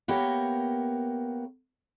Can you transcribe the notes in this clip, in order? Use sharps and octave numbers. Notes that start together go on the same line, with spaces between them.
A#3 B3 G4 A#4 C#5